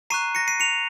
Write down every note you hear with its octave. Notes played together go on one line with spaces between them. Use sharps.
A#5 C#6 F#6 C7 D#7
A#6 C#7
C7 D#7
C#7 F7